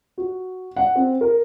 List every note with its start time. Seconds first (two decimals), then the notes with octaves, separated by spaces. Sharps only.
0.18 F#4
0.77 F#5
0.96 C4
1.21 A#4